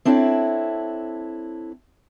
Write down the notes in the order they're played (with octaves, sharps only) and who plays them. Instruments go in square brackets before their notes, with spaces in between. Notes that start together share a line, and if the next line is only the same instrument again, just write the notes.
[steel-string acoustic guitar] C4 D4 E4 A4 C#5